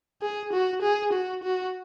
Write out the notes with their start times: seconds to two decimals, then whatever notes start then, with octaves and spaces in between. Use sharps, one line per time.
0.22 G#4
0.53 F#4
0.82 G#4
1.13 F#4
1.43 F#4